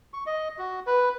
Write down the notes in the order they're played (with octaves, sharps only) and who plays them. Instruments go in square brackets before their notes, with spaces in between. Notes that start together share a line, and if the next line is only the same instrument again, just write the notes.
[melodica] C#6
D#5
F#4
B4